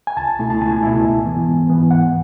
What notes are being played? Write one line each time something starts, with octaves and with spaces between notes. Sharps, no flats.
G#5
C#2 A5
B2 A3 E4
A5
C#2 G#5
B2 A3 E4
G#2
E3 B3
G#2
E3 B3
C#2 F#5